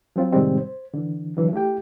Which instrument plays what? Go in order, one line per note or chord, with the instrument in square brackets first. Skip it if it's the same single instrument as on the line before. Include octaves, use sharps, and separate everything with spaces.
[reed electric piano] F3 F#3 C4 F4
A2 C3 D#3 G3 G#3 C4
C5
D3 E3
D3 E3 F#3
A3 E4 G4 G5